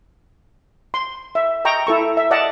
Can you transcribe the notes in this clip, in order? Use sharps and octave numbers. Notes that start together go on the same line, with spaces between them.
C6
E5
D#5 G5 A#5 C#6
E4 A4 C#6
E5
D5 D#5 F#5 A5